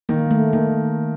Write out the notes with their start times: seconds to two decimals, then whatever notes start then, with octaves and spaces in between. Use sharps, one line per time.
0.09 D#3 A#3
0.31 A3
0.53 D#3 A#3